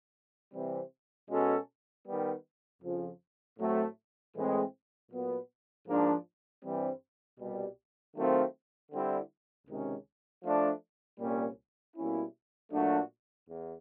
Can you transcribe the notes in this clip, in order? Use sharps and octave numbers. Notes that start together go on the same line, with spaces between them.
C3 E3 G3 C4
B2 G#3 C#4 F#4 A4
D#3 G3 B3
F2 C#3 F3
A2 F#3 A3 C4
A2 E3 G#3 C4
A#2 F#3 B3
G#2 F3 A#3 D4
G2 E3 G3 C4
C2 B2 G3
D#3 F#3 A3 C4 F4
D3 G3 C4 E4
C#2 C3 D#3 G#3 C#4
F3 A3 D4
C2 A#2 G3 A#3 C#4
B2 G3 A#3 C#4 E4
A#2 F#3 A3 D4 F#4
E2